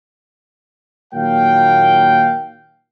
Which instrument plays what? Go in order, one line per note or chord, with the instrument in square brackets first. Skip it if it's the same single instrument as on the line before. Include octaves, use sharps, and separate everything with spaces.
[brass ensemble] A#2 D#3 F#3 A#3 F5 G5